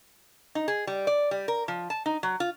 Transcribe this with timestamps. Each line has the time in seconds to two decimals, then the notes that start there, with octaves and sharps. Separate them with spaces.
0.55 D#4
0.68 G#4
0.87 G3
1.07 D5
1.31 G3
1.48 A#4
1.68 F3
1.90 A5
2.06 D#4
2.23 F#3
2.40 F4